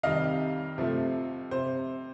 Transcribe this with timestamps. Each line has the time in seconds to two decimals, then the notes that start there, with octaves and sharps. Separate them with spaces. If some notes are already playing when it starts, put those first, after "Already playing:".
0.03 F2 C3 D#3 G3 D#5 F5
0.78 C3 F3 A3
1.51 C3 C5